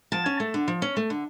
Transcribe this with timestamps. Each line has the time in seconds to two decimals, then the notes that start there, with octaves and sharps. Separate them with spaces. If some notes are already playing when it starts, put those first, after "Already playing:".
0.12 F3 A5
0.26 C#4
0.40 A3
0.54 D3
0.68 F3
0.82 C#4
0.97 A3
1.10 D3